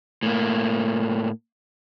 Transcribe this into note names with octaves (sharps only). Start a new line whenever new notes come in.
A2 A#3